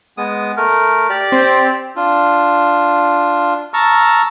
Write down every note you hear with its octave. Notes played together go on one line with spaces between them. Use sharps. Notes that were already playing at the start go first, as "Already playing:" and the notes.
G#3 B3 D#6
A3 A#4
G4 D5
C4
D4 F4
A5 A#5 C#6 E6 F6